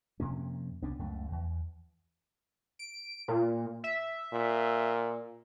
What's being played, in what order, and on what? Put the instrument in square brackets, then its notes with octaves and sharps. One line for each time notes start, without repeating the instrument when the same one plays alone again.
[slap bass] F2 C3 A#3 C#4
C2 B3 C#4 D4
C#2 F#2 A3
E2
[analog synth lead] D7
A#2
E5
[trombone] A#2